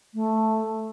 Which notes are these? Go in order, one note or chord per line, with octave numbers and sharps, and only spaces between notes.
A3